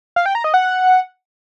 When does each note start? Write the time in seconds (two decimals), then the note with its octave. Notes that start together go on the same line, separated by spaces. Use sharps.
0.16 F5
0.26 G5
0.35 A#5
0.44 D#5
0.54 F#5